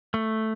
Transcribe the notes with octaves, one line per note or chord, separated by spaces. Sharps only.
A3